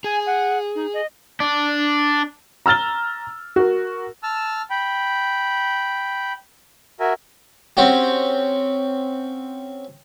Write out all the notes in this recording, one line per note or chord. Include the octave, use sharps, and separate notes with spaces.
G#4 G#5
F#5
D#4
D#5
D4
A#5 E6 F6 A6 G7
F#4 A#4
A5 E6 F6
G5 B5
F#4 A#4 E5 G#5
C4 C#4 F#4 G4